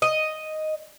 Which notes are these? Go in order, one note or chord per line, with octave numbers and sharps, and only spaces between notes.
D#5